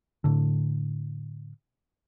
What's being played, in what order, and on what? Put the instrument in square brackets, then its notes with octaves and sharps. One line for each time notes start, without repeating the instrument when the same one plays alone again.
[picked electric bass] A2 D3